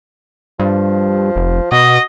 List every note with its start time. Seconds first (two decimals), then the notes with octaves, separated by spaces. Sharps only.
0.60 G2 F3
1.36 F1
1.72 B2 F#4 D#5